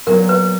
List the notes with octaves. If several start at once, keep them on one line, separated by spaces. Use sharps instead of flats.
A#2 F#3 B3 A#4
B4